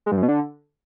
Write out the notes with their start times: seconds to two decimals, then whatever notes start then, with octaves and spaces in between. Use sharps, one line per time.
0.06 G#3
0.12 G2
0.17 F#2
0.23 B2
0.28 D3